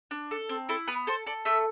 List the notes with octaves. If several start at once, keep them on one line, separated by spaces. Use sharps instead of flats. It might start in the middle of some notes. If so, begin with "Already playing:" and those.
D4
A4
C4
E4 A4
B3 B4
A4 C5
A4 D5
A3 E5